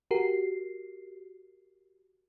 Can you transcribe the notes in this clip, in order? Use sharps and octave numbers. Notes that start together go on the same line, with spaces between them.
F#4 G4 A#4 C7